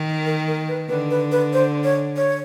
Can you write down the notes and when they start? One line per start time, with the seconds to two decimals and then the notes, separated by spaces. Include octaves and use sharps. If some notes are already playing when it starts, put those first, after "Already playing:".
Already playing: D#3
0.26 A#4
0.47 A#4
0.68 B4
0.89 D3 B4
1.11 B4
1.32 B4
1.53 C5
1.84 C#5
2.16 C#5